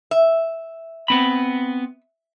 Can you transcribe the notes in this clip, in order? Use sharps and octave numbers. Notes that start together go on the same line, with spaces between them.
E5
B3 C4 B5